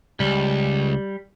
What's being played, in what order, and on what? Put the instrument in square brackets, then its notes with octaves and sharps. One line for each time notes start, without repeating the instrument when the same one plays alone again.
[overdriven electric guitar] C#2 [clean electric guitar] G3